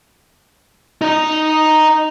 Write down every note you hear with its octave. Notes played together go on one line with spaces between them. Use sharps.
D#4 D#5